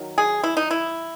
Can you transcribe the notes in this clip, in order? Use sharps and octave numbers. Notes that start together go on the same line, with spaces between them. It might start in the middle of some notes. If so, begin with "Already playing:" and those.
Already playing: D#3 F#3
G#4
E4
D#4
E4